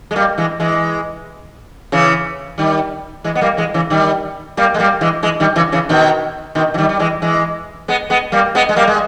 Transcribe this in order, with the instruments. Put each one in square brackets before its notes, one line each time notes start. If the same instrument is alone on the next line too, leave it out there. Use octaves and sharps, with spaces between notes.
[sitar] G#3
G3 A#3
E3 G#3
E3 G#3
C#3 E3
D#3 G3
E3 G#3
B3
G3 A#3
E3 G#3
C#3 E3
D#3 G3
G3 A#3
G#3
G3 A#3
E3 G#3
E3 G#3
D#3 G3
C#3 E3
C#3 E3
B2 D#3
B2 D#3
E3
D#3 G3
G3
E3 G#3
E3 G#3
G#3 B3
G#3 B3
G3 A#3
G#3 B3
G#3
G3 A#3
G#3